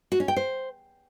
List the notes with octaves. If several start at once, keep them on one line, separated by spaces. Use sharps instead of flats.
F#4
C#4
G5
C5